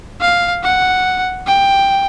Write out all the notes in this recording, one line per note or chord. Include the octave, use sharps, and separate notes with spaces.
F5
F#5
G5